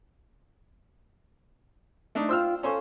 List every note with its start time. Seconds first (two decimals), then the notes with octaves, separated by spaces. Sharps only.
2.15 A3 D4 D#4
2.29 F4 C5 G5 E6 F6
2.63 C#4 A4 C5 F5 G#5 C#6